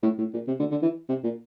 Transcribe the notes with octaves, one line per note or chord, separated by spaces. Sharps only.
A2
A2
A#2
C3
D3
D3
E3
C3
A#2